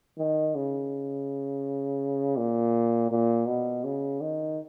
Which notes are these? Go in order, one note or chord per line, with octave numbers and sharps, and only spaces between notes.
D#3
C#3
A#2
A#2
B2
C#3
D#3